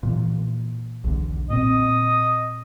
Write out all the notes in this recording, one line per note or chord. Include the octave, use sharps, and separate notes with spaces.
A#2 E3
B1 E2 D3
A#2 C4 D#5